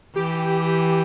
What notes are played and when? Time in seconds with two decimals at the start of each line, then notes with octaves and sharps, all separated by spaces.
0.16 E3 G4